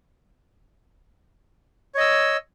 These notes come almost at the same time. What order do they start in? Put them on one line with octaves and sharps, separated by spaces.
C#5 D#5 E6